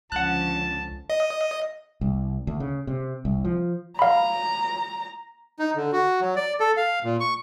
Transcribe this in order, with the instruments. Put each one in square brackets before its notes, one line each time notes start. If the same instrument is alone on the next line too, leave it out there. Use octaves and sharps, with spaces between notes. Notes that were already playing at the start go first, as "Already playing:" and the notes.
[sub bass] C#2 [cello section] D3 F3 C#4 [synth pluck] F#5 F#6 [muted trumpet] A5
[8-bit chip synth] D#5
[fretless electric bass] C2
D2
C#3
C3
C2
F3
[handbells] F5 B5 [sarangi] A#5
[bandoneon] D#4
D3
F#4
F#3
D5
A4
F5
A#2
C#6